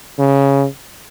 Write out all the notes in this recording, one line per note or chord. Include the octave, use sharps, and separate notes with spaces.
C#3